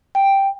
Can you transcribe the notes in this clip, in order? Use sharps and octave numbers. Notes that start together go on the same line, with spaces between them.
G5